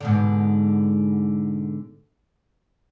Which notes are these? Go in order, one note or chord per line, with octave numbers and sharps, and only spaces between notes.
G#2 B2 D3